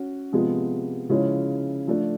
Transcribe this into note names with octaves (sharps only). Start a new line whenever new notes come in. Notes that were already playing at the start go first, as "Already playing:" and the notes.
Already playing: C#4 F#4
C3 F3 G#3 B3
C#3 F3 G#3 C#4 E4
F3 A3 D4